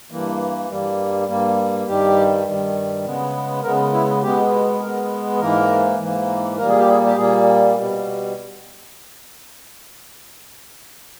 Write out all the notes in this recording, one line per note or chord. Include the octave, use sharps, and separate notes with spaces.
G2 E3 A#3
G2 G3 A#3
G2 G3 A#3
G2 D#3 G3 G4
G2 D#3 G3
C#3 G#3 B3
C#3 G#3 B3 A#4
E4
B2 G#3 B3 G4
B2 G#3 B3 A#4
G#2 E3 A#3 A#4
G#2 E3 A#3
A#2 G3 A#3 A#4
G#4
G4
G#4
G4
A#2 G3 A#3 G#4
B2 G3